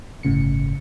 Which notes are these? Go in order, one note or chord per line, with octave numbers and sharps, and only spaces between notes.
G1 A2 C#3 C#7